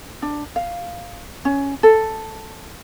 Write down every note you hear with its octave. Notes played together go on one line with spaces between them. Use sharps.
D4
F5
C#4
A4